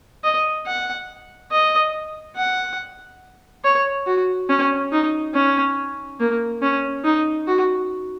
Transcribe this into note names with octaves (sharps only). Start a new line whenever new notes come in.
D#5
F#5
D#5
F#5
C#5
F#4
C#4
D#4
C#4
A#3
C#4
D#4
F#4